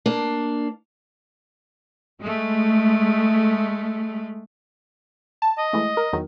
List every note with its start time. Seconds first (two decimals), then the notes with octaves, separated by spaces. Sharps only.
0.06 A#3 D4
2.21 G#3 A3
5.42 A5
5.58 D#5
5.73 E3 G#3 A3
5.97 A#4
6.13 E2 D#3 F#3